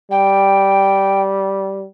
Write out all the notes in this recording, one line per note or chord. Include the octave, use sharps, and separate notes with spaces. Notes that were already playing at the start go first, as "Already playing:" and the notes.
G3 G5